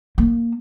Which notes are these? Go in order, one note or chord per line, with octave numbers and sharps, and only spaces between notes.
A#3